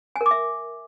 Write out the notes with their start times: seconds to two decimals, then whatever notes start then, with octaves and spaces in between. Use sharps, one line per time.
0.16 G#5
0.21 A#4
0.26 D6
0.31 E5